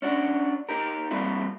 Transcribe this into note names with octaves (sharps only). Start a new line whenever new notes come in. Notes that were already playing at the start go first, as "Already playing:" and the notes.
C#4 D4 F#4
D#4 G4 A#4
G3 A#3 C4 E4 F#4